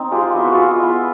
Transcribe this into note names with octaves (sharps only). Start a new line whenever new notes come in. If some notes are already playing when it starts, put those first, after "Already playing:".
Already playing: C4 D#4
G#3 F4 G4
F4
B3 E4 F#4
F#4
G#3 F4
F4
B3 E4